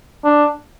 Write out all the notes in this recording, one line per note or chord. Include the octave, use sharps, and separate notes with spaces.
D4